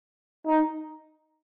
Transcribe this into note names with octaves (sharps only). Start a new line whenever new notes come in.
D#4